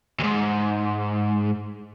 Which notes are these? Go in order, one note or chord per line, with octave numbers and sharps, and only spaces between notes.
D2 G#2